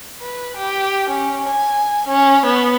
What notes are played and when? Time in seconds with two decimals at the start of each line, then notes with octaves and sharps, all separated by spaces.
0.21 B4
0.57 G4
1.10 C#4
1.49 G#5
2.08 C#4
2.46 B3